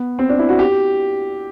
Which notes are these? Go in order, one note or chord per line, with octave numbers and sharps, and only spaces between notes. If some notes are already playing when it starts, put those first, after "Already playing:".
Already playing: B3
C4
D4
E4
F#4
G4